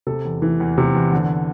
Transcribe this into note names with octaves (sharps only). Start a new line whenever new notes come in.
C3 A4
E2
E3
E2
C3
E2
D3